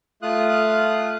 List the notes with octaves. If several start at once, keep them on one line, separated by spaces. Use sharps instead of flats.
A3 F4 F5 D#6 F#6